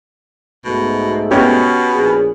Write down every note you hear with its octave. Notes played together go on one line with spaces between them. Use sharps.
B1 G#2 B2 A3
B2 B3 C#4 G4 C#5
A#1 G#4